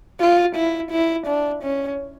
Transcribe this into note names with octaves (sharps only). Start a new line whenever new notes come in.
F4
E4
E4
D4
C#4